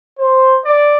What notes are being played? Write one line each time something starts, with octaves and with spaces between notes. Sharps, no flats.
C5
D5